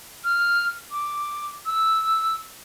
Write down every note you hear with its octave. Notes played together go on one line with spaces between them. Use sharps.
F6
D6
E6